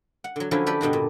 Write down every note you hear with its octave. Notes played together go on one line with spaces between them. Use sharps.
F#5
D3 F#3
D3 F3 F#3 C#4 E4
G4 A4 B4 D5
G2 B2 D3 F#4
A#2